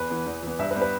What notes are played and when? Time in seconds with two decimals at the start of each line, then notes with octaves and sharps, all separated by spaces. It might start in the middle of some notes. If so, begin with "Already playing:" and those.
Already playing: E2 B4
0.10 E3 B3
0.26 E2
0.43 E3 B3
0.59 G2 E5
0.71 B4
0.76 G3 B3
0.82 B4